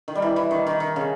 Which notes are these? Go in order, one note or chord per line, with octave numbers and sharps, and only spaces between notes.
D#3
G3
E3
E3
D#3
D#3
D#3
C#3